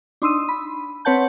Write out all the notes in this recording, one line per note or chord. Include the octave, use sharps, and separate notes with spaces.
D4 D#4 C6 D#6 E6 D#7
B5
C4 B4 C#5 F#5 A5 G6